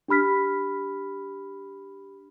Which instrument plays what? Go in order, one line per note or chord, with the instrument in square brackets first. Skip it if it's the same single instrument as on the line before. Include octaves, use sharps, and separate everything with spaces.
[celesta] D4 G4 B5 F6 B6